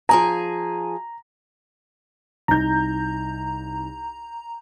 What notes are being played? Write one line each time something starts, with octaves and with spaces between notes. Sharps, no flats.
F3 G#4 G#5 A#5
C2 D#4 A#5 G6